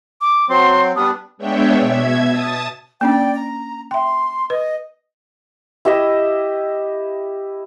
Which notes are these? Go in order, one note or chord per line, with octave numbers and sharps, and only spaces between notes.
D6
F#3 C4 C6
G3 B3 D4 D#6
G#3 B3 D4 C#5 E5 G5
B2 E5 G#6
A5 D#6 A6
A#3 C#4 D4 D5 G5
A#5
E5 G5 C6
B4 D#5
E4 G4 D#5 E5